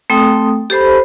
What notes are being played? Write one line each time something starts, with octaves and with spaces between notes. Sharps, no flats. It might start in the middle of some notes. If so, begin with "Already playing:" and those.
A3 C4 A4 G5 D#6
G4 A4 C5 B5